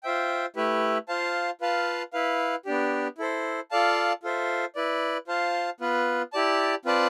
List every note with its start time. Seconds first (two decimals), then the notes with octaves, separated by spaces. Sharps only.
0.03 F4 C5 E5 G5
0.56 A3 E4 G4 B4 E5
1.08 F4 C5 F5 A5
1.61 F4 B4 F5 A5
2.13 E4 B4 F5
2.65 B3 D4 G4
3.18 E4 A4 C5
3.71 F4 A4 D5 F5 A5
4.23 F4 A4 C5 E5
4.76 E4 B4 D5
5.28 F4 C5 F5 A5
5.80 B3 F4 B4
6.33 E4 G4 D5 A5
6.85 C4 F4 B4 D5 A5